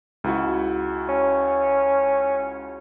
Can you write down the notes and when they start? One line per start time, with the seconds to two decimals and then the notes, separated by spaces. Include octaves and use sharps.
0.24 C#2 E4 F#4
1.09 C#4